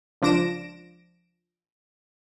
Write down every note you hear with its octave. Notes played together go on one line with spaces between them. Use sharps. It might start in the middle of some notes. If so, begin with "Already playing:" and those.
C#2 F3 D4 A#6 D7 E7